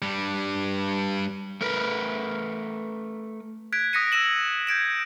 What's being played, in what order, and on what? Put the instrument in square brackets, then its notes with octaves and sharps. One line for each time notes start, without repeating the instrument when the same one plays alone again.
[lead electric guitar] G2 G3
[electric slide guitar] A3 A#4 B4
[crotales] F#6 G#6 B6 D7
D#6 F#6 A#6 B6 C#7 D#7
E6 A#6 D#7 E7 F#7
G6 G#6 D7 E7